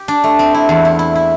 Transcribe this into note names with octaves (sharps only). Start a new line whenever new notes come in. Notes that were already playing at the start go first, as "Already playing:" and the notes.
Already playing: G4
D4
A3
C4
E4
E2
E4
E4
E4